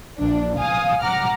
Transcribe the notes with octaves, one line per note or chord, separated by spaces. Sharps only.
A#1 E3 D4
F5 G#5 D#6
F#5 A#5 D6 F6